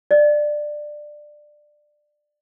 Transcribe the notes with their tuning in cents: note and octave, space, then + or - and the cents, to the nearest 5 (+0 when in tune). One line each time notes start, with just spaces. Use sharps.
D5 +15